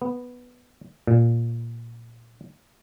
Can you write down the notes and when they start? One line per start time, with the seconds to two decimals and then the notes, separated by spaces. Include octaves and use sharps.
0.02 B3
1.07 A#2